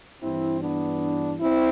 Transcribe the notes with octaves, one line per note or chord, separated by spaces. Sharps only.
G2 E3 C4 E4
B3 D4
C4 E4